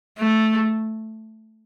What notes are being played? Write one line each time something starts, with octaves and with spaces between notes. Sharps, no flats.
A3